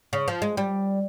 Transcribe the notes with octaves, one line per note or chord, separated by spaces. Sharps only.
C#3
F3
G#3
G3